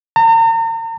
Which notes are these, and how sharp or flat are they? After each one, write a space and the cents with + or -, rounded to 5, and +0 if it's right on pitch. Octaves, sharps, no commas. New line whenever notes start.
A#5 -40